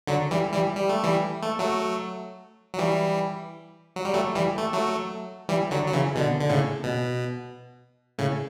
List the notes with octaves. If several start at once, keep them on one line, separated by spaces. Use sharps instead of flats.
D3 F#3
E3 G3
E3 G3
G3
A3
E3 G3
A3
F#3 A3
F#3
E3 G3
F#3
G3
F#3 A3
E3 G3
A3
F#3 A3
E3 G3
D3 F#3
F#3
C#3 E3
B2 D3
D3
A2 C#3
B2
A2 C#3